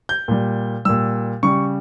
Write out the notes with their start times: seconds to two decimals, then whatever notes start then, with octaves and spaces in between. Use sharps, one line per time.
0.09 G6
0.28 A#2 G3
0.85 A#2 G3 E6
1.43 C#3 G3 C#6